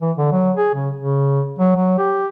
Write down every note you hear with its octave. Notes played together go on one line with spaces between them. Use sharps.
E3
D3
F#3
G#4
C#3
C#3
F#3
F#3
G4